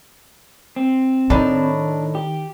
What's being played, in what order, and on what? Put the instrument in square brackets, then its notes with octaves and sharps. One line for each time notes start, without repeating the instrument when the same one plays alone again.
[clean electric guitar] C4
[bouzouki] A2 D#4 A5 [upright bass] D#3 [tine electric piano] D4
[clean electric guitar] G4